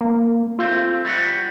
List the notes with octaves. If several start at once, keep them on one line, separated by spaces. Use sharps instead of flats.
A#3
A3 C4 F4
G3 F#4 F#5